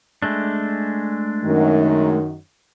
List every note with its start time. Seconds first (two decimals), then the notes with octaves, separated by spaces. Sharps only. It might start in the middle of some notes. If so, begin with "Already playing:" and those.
0.22 G#3 A3 D4
1.44 F#2 D#3